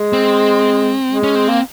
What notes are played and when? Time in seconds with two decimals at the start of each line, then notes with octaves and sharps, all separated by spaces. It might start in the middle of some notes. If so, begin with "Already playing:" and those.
Already playing: G#3
0.13 C4
1.11 G#3
1.23 C#4
1.35 C4
1.48 A#3